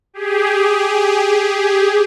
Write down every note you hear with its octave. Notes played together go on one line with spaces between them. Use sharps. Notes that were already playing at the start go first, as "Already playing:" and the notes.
G4 G#4